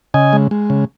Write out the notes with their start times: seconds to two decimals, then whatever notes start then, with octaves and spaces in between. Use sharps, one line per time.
0.14 C#3 D#5 G#5
0.33 G#3
0.51 G#3
0.70 C#3